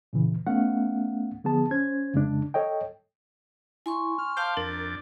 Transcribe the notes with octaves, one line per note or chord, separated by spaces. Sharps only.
A#2 C#3 E3
A3 B3 C#4 F5 F#5
D3 F3 B3 G#4 A5
C#4 C5 G#6
F2 C#3 G#3 D4
A4 C#5 D#5 G5
E4 G#5 C6 C#6
F6
C5 F5 G5 A5 C6 D6
F2 D4 A#4 D5